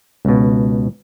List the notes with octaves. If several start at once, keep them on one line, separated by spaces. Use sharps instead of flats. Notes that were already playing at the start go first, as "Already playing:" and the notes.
C#2 B2